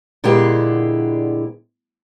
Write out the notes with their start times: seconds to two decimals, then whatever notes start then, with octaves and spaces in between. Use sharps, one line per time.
0.24 A#2 D3 G#3 B3 E4 G4